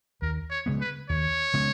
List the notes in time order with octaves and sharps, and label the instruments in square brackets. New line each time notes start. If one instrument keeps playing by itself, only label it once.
[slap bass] D#2 [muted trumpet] A#4
[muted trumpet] C#5
[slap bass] C#3 G#3 B3
[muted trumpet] B4
[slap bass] D#2 [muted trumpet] C#5
[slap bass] C#3 G#3 B3